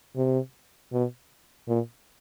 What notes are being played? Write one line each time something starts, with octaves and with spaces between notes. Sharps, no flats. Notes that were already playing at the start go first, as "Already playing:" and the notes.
C3
B2
A#2